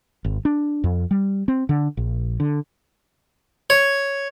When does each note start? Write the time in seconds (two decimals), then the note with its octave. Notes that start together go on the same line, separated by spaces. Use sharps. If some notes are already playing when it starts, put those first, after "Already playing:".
0.24 G#1
0.45 D4
0.84 F2
1.11 G3
1.48 C4
1.69 D3
1.97 A#1
2.40 D3
3.70 C#5